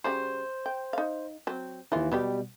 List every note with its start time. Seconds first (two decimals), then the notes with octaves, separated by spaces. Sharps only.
0.04 C#3 G3 F#4 C5
0.66 G5
0.93 D#4 F5
1.47 F#3 C4
1.92 D#2 E3 D#4 F4
2.12 B2 F#3 G3 B3 G4